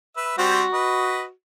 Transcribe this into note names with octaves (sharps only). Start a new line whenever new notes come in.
B4 E5
G3 C4 F#4 C5
B4 D#5